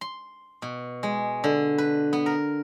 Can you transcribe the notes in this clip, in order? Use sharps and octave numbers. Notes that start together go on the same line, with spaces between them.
C6
B2
G#3
D3
B4
B3
A#4